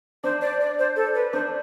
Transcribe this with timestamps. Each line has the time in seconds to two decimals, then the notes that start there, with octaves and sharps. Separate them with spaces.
0.24 D4 C5
0.41 D5
0.61 D5
0.79 C5
0.96 A4
1.14 B4
1.33 D4 C5